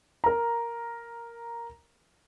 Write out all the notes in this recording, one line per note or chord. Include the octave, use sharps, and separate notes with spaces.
A#4 A#5